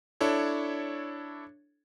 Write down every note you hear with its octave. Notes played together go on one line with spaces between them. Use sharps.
D4 E4 A4 C#5